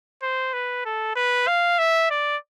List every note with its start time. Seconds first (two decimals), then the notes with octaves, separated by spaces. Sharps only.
0.22 C5
0.53 B4
0.85 A4
1.16 B4
1.47 F5
1.79 E5
2.10 D5